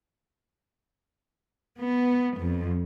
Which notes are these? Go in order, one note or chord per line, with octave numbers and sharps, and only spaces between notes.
B3
F2